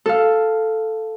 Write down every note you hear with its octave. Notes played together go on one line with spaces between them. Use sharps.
A4 F5